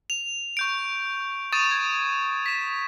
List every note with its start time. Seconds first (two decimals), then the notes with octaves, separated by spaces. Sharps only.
0.10 F7
0.57 C#6 G6 D7
1.52 C#6 D#6 A6 D#7 E7
1.71 G#6
2.46 B6 E7